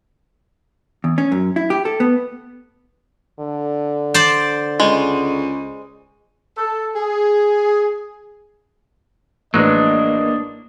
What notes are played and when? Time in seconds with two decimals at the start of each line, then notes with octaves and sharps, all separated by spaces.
1.04 E2
1.18 C#4
1.32 F#2
1.56 E4
1.70 G4
1.85 A4
2.00 B3
3.40 D3
4.14 C5 D5
4.80 C#2 G#3
6.57 A4
6.96 G#4
9.54 A1 F#3 G#3 A#3 D4 B4 D#5